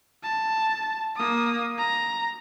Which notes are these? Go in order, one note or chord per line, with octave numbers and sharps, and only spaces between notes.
A5
A#3 D#6
A#5